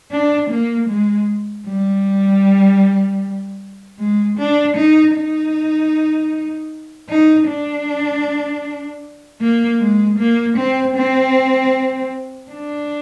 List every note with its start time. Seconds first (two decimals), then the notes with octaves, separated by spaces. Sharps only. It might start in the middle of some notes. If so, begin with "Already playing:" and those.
0.11 D4
0.50 A#3
0.89 G#3
1.67 G3
3.99 G#3
4.38 D4
4.76 D#4
5.15 D#4
7.09 D#4
7.47 D4
9.41 A#3
9.80 G#3
10.19 A#3
10.57 C4
10.96 C4
12.51 D4